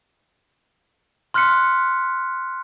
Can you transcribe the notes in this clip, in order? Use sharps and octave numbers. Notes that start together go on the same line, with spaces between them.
C6 F6 F#6 B6 C#7